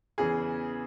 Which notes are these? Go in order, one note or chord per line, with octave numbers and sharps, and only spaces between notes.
E2 C#3 E3 G#4